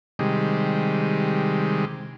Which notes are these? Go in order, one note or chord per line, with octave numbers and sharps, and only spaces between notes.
C3 D#3 G3 G#3